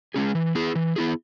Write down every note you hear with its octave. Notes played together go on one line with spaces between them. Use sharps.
G#3 C#4 G#4
E3
B3 E4 G#4
E3
B3 E4 G#4